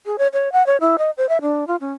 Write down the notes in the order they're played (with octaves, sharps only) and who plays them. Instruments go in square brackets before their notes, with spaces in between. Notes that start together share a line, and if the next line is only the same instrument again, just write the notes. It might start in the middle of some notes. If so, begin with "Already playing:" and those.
[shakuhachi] G#4
C#5
C#5
F#5
C#5
E4
D#5
C5
E5
D4
F4
C#4